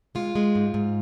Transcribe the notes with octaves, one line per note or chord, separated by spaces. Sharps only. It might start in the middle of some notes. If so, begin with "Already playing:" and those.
G#3 F4
G#3
G#2
G#2